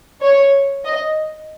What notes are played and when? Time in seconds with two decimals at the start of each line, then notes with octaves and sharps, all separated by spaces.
0.21 C#5
0.85 D#5